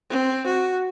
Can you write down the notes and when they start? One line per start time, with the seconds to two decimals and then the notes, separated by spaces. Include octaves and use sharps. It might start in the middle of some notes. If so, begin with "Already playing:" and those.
0.11 C4
0.46 F#4